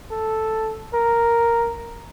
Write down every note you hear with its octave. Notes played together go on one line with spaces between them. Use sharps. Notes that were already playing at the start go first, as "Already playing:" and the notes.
A4
A#4